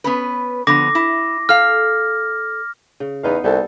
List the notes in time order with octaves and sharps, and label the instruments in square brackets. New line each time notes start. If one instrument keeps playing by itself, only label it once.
[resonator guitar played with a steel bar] B3 C#4 B4
[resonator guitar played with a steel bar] D3 F3 B3 [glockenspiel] D6 A#6
[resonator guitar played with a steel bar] E4
[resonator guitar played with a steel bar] A4 F5 [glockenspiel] F6
[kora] C#3
[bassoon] E2 [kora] B3 D#4 F5
[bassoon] C2 [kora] G3 A4